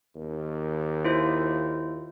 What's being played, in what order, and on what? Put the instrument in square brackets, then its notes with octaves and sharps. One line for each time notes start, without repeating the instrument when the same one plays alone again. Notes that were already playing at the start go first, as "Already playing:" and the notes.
[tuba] D#2
[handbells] E4 F4 C5